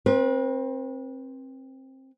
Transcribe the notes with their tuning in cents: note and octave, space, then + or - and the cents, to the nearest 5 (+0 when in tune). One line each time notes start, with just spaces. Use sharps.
C4 +20 B4 -35